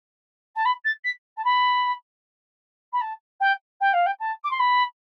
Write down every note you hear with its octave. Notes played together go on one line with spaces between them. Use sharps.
A5
B5
A6
B6
A5
B5
B5
A5
G5
G5
F5
G5
A5
D6
C6
B5